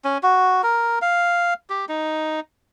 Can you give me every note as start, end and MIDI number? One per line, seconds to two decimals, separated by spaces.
0.04 0.18 61
0.23 0.62 66
0.63 0.99 70
1.02 1.54 77
1.70 1.85 67
1.89 2.40 63